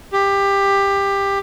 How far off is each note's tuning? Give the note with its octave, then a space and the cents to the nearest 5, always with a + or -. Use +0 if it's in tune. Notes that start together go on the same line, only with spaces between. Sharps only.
G4 +15